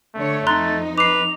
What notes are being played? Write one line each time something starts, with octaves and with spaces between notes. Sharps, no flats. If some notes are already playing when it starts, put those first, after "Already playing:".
D3 A3 C#5
F2 D#4 A#5 C6 F#6 A6
B4 D6 C7 F7